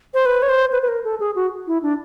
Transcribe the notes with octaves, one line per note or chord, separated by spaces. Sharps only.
C5
B4
C#5
C5
B4
B4
A#4
A4
G#4
F#4
E4
D4